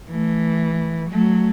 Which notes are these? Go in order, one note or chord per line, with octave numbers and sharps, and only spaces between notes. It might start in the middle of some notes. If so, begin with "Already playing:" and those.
E3 A3
F#3 A3